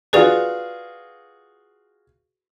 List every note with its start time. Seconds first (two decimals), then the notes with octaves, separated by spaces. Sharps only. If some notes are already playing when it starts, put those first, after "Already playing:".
0.13 F4 F#4 G#4 B4 D5 F7